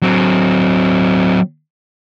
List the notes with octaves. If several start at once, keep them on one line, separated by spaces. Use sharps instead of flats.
F#3 C4